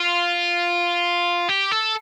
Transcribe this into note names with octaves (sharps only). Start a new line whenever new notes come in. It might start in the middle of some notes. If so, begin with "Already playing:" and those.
Already playing: F4
G4
A4